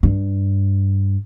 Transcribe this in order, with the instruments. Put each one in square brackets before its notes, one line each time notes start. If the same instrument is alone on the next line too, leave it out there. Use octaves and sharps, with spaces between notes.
[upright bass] G2